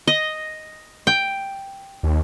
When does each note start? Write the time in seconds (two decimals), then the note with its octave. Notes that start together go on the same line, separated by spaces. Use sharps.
0.07 D#5
1.07 G5
2.03 D#2